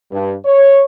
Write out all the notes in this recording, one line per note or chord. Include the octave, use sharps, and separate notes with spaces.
G2
C#5